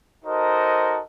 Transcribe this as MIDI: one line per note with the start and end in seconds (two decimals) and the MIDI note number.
0.24 0.99 63
0.24 0.99 66
0.24 0.99 69
0.24 0.99 70
0.24 0.99 72
0.24 0.99 75